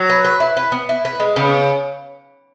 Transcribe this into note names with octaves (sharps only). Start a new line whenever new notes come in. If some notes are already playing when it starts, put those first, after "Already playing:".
Already playing: F#3
B4
B4
E4
B4
B3
E4
B4
G#3
C#3 B3